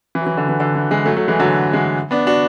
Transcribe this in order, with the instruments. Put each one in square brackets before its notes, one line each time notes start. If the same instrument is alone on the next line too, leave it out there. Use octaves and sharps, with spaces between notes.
[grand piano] E3
F#3
E3
D3
E3
D3
E3
E3 G#3
F#3 A3
F#3 A3
E3 G#3
D3 F#3
E3 G#3
B3 D4
D4 F#4